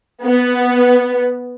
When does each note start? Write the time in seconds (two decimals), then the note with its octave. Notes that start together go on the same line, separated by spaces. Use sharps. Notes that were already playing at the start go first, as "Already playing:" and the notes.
0.22 B3